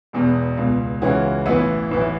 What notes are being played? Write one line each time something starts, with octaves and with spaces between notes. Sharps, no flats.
E1 E2 B2
C#2 B2
C#2 C#3 E3 C#4 F#4
A1 A2 E3 B3 E4
A1 A2 E3